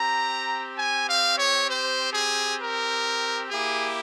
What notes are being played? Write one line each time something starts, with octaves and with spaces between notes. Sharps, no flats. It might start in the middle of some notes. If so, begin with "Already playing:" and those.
Already playing: C4 G4 A#5
G#5
F5
C#5
C5
G#4
A#4
A#3 E4 G4 G#4